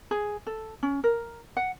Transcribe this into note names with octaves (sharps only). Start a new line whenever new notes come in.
G#4
A4
C#4
A#4
F#5